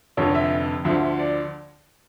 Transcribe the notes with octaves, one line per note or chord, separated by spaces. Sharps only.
F1 F2 D3 C#5
E5
D2 D3 F3 E5
D5